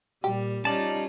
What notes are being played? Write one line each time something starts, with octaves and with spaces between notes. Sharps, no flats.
A#2 G3 G4
G3 C#4 D#4 F4 D5 A5